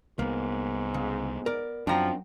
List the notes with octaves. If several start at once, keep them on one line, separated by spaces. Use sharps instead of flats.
C2 G#2 A#3 B3
C#3
B3 A#4 D5
F#2 F3 F#3 C4 D4 F#5 G5 A#5